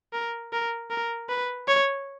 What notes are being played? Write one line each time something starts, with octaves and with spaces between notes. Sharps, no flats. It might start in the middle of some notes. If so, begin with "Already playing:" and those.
A#4
A#4
A#4
B4
C#5